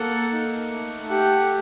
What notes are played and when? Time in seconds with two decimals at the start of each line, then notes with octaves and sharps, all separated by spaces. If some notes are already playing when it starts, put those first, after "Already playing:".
Already playing: A#3 A4 F#5 F#6
0.32 D#4
0.71 A3
1.10 G4 F#5 F#6